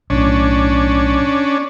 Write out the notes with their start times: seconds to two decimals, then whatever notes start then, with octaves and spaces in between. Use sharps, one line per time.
0.10 B1 A2 C#4 D4